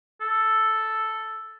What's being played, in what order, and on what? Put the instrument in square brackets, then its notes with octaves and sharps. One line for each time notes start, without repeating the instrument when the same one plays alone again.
[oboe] A4